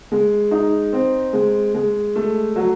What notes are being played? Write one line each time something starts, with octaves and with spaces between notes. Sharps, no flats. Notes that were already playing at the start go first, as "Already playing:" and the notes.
G#3
D#4
C4
G#3
G#3
A3
F#3